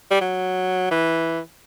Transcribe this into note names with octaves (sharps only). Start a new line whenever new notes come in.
G3
F#3
E3